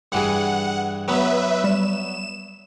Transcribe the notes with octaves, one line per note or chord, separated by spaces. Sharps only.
G2 E3 G#4 F#5
F#3 B3 B4 E5
G3 E7